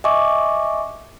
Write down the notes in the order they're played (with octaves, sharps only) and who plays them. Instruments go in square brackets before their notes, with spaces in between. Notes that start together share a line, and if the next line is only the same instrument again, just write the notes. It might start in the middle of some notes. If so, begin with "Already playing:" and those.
[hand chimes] D#5 E5 G#5 C#6 D6